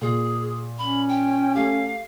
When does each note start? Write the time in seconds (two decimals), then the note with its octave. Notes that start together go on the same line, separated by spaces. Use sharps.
0.01 A#2 G#4 C7
0.79 C#4 B5
1.09 G5
1.55 A3 G4 F5